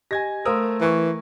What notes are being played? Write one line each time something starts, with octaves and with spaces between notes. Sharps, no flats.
G4 D#5 G#5 G#6 A#6
A3 A#4 C5 F5 C6 D#6 E6
E3 A#4 C#6